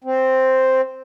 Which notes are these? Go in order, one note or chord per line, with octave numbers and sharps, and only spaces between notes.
C4